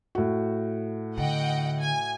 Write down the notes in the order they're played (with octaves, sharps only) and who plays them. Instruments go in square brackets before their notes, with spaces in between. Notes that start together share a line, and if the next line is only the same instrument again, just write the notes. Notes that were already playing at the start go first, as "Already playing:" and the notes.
[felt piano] A2 F#4
[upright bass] D3 [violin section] D#5 F#5 G5
[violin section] G#5